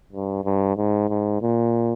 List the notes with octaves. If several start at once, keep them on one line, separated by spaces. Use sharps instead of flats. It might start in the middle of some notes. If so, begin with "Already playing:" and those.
G2
G2
G#2
G#2
A#2